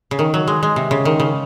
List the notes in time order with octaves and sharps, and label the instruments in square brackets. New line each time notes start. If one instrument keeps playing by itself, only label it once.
[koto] C#3
D#3
F#3
G#3
G#3
C3
C#3
D#3
C#3